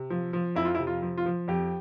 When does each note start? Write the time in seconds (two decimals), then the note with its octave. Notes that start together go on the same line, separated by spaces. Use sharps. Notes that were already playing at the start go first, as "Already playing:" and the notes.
Already playing: C3
0.10 F3
0.33 F3
0.55 F2 E4
0.65 F4
0.75 E4
0.79 C3
0.87 F4
1.02 F3
1.18 F4
1.26 F3
1.48 F2 G4